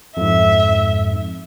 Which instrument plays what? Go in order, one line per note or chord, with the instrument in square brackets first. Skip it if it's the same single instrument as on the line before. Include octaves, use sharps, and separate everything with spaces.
[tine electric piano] F2 G#2 [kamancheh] E5